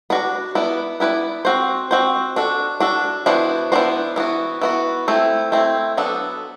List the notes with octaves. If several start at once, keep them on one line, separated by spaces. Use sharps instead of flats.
B3 D4 F#4 B4 D5
B3 E4 B4 D5
B3 E4 B4 D5
C4 F#4 C5
C4 F#4 C5
D4 F#4 A4
D4 F#4 A4
E3 B3 D4 F#4 C5
E3 B3 D4 F#4 C5
E3 B3 F#4
E3 B3 F#4
A3 C4 E4
A3 C4 E4
F#3 B3 D4 A4